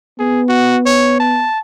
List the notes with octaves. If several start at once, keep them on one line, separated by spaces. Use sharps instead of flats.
B3 G#4
F#4
C#5
A5